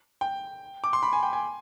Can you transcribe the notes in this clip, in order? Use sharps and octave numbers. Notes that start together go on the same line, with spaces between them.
G5
D6
C6
B5
G#5
G5
G#5